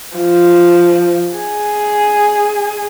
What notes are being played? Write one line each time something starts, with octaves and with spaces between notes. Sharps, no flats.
F3
G#4